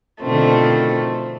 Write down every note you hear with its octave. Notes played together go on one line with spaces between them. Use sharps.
B2 D3 D#3 F3 A3 C4